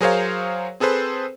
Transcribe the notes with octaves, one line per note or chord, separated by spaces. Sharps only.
F#3 G#4 A#4 C5 C#5 F5
C4 G#4 A4 B4 C5